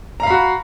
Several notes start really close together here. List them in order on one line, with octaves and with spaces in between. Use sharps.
A#5 F5 B5 F#4